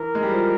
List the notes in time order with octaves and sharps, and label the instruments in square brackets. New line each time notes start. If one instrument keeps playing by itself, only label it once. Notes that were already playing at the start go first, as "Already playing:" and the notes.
Already playing: [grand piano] E3 [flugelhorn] A#4
[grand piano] G#3
G3
F3